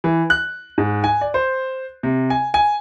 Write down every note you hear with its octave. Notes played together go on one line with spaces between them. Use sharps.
E3
F#6
G#2
G#5
D5
C5
C3
G#5
G#5